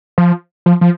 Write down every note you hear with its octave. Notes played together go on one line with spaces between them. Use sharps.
F3
F3
F3